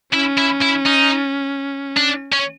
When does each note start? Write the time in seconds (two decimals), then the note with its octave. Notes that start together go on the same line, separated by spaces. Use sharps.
0.13 C#4 E4
0.38 E4
0.62 E4
0.86 D#4
1.97 D4
2.32 C#4